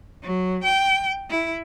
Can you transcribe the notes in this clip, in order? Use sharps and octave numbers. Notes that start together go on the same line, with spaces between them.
F#3
G5
E4